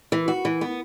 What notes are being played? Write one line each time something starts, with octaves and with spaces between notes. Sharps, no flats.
E3
F#4
E3
B3